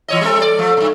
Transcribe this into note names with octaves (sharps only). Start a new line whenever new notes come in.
E3 C#5 D#5
G3 C4 A4
D5
F3 A3
G2 B2